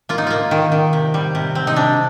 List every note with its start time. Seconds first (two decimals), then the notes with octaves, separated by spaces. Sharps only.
0.09 A#3 F4
0.18 D#4
0.27 A#3 F4
0.51 D#3
0.72 D#3
0.93 C3
1.14 G3
1.35 C3
1.55 C4
1.67 D#4
1.76 C3 D4